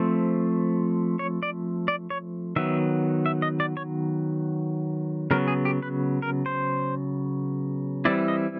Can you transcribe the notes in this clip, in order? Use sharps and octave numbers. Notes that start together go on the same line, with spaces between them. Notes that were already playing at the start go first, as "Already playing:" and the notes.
Already playing: F3 A3 C4
C#5
D5
D5
C#5
D#3 F#3 B3 E5
E5
D#5
D5
C#5
C#3 F#3 B3 A#4
G#4
G4
B4
A#4
C5
E3 G3 C4 E4 D5
D#5